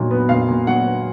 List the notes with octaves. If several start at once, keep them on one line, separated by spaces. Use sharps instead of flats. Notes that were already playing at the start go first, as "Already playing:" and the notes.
Already playing: A#2 F#3 D#4
B3
A#2 F5
A#2
F#3 F#5
B3